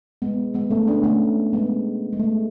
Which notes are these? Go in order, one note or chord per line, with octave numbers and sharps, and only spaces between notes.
G#3 B3
G#3 B3
A3 C#4
B3 D4
A3 C#4
G#3 B3
G#3
A3